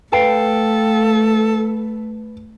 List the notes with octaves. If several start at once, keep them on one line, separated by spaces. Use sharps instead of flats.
A3 A4 B4 F5 G5